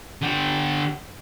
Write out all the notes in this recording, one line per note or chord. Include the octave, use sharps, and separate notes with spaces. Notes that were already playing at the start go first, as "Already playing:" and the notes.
D3 G4